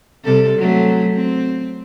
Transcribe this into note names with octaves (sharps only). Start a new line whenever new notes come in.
C3 G3 A4
F#3 A3 C4
C4